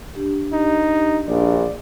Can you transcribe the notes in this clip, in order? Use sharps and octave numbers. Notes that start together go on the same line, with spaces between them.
D4 G4
D#4
A#1 D5